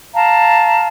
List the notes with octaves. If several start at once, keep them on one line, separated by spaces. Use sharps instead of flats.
F5 A5 A#5